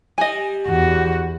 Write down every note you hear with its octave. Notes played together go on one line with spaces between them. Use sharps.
G3 D#5 G#5
E2 F#4